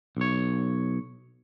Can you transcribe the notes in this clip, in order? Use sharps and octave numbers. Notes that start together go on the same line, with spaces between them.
B1 C#5